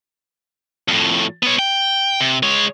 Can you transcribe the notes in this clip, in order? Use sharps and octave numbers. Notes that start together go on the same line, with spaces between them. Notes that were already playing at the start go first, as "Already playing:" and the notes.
F2 A2
B3 C#5
G5
C3
G#3 C#5